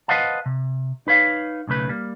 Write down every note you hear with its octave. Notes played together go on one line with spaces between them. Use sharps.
B4 C5 D#5 F5 F#5 A5
C3
D#4 B4 C#5 F5
B1 C#3 A3 B4
G3 A#3